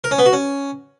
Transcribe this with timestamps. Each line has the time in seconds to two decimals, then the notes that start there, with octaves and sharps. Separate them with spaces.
0.04 A#4
0.11 C#4
0.18 B3
0.26 F#4
0.33 C#4